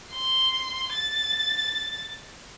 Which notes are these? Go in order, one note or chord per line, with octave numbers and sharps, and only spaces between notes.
C6
A6